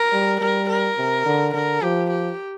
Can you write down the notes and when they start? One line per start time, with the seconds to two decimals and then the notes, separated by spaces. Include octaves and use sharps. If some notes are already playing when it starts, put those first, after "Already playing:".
Already playing: A#4
0.13 G3
0.41 G3 A#4
0.70 A#4
0.98 C3
1.26 D3
1.54 D3 A#4
1.82 F3 G4
2.10 G4